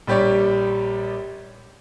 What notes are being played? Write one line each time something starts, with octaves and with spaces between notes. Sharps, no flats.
A#1 G3 G4 C#5 D5